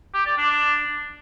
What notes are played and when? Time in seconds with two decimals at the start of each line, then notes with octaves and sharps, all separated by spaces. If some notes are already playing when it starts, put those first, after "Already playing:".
0.14 G4
0.26 D5
0.37 D4